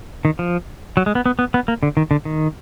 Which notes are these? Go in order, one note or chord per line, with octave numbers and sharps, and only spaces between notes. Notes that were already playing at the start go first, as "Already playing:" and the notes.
D#3
F3
F#3
G#3
B3
B3
B3
B3
A#3
D3
D#3
D3
D#3